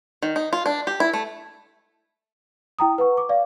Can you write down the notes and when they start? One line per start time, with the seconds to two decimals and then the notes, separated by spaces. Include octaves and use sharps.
0.23 D#3
0.36 D#4
0.53 F4
0.66 D4
0.87 G4
1.00 E4
1.14 A3
2.79 E4 G5 A#5 D#6
2.98 B4 F#5 C#6
3.17 D6
3.29 D5 F5